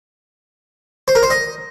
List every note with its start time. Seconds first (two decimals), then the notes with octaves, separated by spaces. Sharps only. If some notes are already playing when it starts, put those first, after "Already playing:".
1.08 C5
1.15 A#4
1.23 C5
1.30 D#5